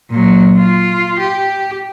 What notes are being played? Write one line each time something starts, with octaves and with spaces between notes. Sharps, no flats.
A#2 F#3
F4
G4